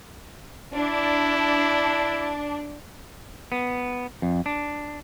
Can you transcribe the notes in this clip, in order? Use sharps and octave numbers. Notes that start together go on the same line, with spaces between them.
D4 E4
B3
F2
D4